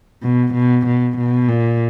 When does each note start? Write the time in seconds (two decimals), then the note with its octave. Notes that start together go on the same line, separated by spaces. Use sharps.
0.23 B2
0.54 B2
0.86 B2
1.18 B2
1.49 A#2